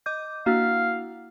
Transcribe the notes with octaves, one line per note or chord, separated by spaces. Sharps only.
D#5 D6 G6
A#3 D4 E4 F#4 F5